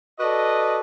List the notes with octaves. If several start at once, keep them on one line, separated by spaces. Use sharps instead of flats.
F#4 A4 B4 D5 D#5